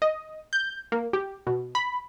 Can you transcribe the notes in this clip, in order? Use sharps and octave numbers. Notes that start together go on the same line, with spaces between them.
D#5
G6
A#3
G4
B2
B5